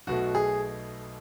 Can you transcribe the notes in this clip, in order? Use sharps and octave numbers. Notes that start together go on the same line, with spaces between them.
B1 B2 A3 F#4
G#4